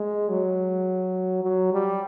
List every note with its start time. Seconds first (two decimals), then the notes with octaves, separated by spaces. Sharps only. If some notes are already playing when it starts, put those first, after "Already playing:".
Already playing: G#3
0.29 F#3
1.43 F#3
1.73 G3